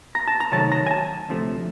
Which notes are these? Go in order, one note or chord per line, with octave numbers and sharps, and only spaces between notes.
A#5
A5
A#5
C3 D#3 F#3 A3 A5
A#5
G#5
A5
D2 C3 F3 A3